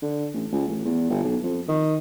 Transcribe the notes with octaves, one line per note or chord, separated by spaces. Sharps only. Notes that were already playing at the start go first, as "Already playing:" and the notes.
D3
A1
C#2
A1
E2
G1
B1
F2
D#3